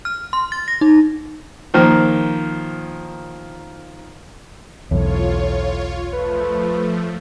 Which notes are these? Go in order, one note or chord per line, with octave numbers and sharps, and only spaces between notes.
F6
C6
A6
A#6
D#4
D#3 F3 A#3
B1 E2 A2 F4 C#5
F3 A3 B4